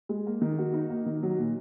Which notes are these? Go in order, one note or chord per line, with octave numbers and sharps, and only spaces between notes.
G#3
A#3
D#3
F#4
D#4
A#3
D#3
F#3
A#2